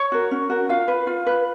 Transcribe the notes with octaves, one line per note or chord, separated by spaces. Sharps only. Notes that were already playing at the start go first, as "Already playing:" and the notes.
Already playing: C#5
F#4 A#4
C#4
F#4 A#4
F4 F5
B4
F4
B4